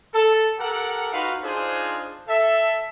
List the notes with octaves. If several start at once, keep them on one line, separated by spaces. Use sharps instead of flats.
A4
G4 A4 A#4 F#5
D#4 F4 F#4 B4 F5
D4 D#4 F4 G#4 C5
A4 E5